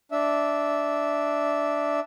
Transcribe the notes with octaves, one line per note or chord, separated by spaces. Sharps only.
D4 E5